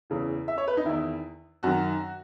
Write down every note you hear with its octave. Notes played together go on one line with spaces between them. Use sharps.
E2 C#3 E3
E5
C#5
B4
D#4
E2 D#3 E4
F#2 D#3 F#4